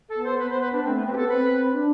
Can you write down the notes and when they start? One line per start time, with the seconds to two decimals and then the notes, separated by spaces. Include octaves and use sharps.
0.09 A4
0.16 B3
0.24 C5
0.39 B3 B4
0.50 C5
0.61 B4
0.72 D4
0.84 A3 C4
0.95 B3
1.06 B3 C4
1.13 G4
1.17 A4
1.28 C4 B4
1.73 D4